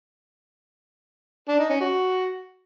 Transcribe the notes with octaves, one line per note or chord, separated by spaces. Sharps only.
D4
D#4
C#4
F#4